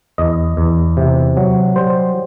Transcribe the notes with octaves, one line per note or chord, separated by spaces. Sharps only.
E2 D#5
E2
C3
F#3
G3 C5